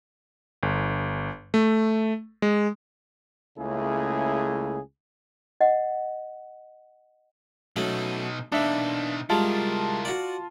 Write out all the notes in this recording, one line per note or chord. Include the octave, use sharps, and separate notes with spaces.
G1
A3
G#3
C#2 C#3 A3 A#3 E4 G#4
D#5 F#5
B2 F#3 A3 C#4 D#4
B2 E3 A#3 D4 D#4 E5
G3 G#3 E4 F4 A#4 A5
F#4 D5